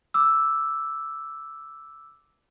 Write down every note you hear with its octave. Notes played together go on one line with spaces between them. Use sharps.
D6 E6